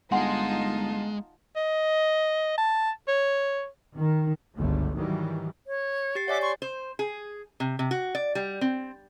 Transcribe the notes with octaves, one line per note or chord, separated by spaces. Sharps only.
G1 G#3 D#4 F4 F#5 G#5 A5 C6
D#5
A5
C#5
D#3
G1 C#2 F#2 D3 A3
G#2 D#3 E3 F#3 G3
C#5
G4 A6 C7
C#5 D5 E5 F#5 G#5 D6
C6 C#6
C5
G#4
C3
C3
F#4
D5
G3
C4